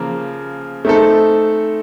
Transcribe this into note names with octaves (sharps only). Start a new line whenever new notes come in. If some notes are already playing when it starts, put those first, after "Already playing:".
Already playing: C#3 F3 A#3
A3 C4 D#4 A4